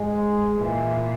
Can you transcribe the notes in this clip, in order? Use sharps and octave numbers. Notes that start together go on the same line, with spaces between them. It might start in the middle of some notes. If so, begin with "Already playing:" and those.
Already playing: G#2 G#3
A#2 E3